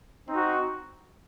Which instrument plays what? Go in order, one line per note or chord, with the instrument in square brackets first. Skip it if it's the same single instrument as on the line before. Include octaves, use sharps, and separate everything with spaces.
[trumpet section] C4 D#4 F#4